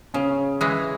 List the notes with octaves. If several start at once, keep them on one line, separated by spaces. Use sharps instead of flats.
C#3 C#4
E3 G#3